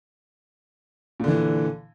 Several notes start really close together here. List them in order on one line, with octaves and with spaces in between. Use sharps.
A#2 D3 E3